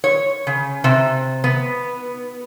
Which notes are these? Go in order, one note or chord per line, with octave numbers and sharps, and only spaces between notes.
C#5
C#3
C3
B3